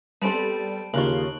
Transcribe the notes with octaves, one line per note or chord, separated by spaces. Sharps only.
G3 B3 C4 A4 A5 B5 D7
D#2 C#3 A#3 F4 C#6 F#6 F#7